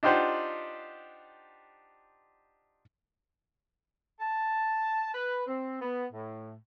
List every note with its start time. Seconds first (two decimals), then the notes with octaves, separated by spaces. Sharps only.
0.03 D4 D#4 F4 G4 C5 F#5
4.19 A5
5.13 B4
5.47 C4
5.81 B3
6.11 A2